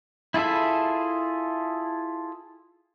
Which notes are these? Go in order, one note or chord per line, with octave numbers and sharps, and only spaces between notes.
E4 F4 G#4 A4 E5